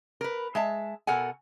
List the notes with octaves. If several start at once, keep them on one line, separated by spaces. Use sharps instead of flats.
A#4 B4
G#3 E5 A5
B2 A4 A#4 F#5 G#5